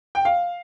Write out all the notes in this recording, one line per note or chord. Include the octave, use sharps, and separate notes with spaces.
G5
F5